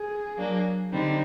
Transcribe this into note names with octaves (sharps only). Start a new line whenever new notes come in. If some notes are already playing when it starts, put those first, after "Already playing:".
Already playing: G#4
F#3 A#3 D4
D3 G3 C4 D#4